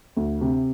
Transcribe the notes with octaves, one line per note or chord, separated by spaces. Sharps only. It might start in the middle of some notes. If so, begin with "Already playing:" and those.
D2
C3